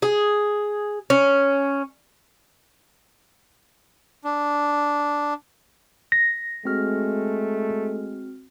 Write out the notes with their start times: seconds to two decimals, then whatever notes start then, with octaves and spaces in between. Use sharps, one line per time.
0.02 G#4
1.10 C#4
4.25 D4
6.12 A#6 B6
6.65 G#3 A3 C4 F#4 F6